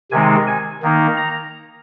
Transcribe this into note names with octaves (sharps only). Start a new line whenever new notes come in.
C3 D#3 G#3 C4 D#4 G#5
G#5
D#3 A#3 D#4
A#5